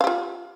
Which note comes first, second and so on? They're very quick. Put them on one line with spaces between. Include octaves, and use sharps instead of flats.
F5 G4 F4